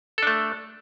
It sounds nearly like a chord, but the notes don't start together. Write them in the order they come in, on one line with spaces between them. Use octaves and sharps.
A4 D4 A3